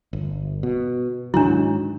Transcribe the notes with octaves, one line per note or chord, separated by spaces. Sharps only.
G1
B2
G#2 D#3 F#3 D4 E4